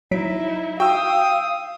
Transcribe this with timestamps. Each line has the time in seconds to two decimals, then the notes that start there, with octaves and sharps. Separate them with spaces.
0.11 F#3 D#4 E4 B6 D7
0.80 F#4 F5 G5 D#6 E6